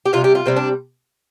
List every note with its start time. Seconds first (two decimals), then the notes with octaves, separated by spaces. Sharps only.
0.05 G4
0.13 C3 G3 F4
0.24 G4
0.35 F4
0.46 C3 G3 C4
0.56 D4